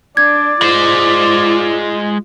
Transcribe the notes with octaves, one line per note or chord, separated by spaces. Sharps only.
D4 D5 G#6
G#3 F4 C5